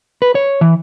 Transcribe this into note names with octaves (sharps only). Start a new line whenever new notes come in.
B4
C#5
E3